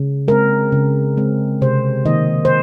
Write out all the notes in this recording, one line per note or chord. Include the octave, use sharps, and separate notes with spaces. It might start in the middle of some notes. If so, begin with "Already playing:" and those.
Already playing: C#3
G#3 C4 A#4
C#3
G#3 C4
C3 C5
D#3 A#3 D#5
C5